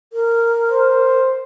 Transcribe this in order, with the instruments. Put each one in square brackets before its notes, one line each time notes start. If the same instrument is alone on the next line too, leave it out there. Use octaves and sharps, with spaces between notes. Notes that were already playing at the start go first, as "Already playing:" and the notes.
[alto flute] A#4
[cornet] C5